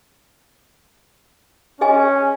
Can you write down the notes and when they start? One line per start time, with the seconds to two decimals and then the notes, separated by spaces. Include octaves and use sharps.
1.81 C#4 G#4 D#5 G#5